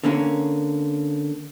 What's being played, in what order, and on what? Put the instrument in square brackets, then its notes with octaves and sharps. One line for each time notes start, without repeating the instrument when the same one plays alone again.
[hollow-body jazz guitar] D3 A#3 C#4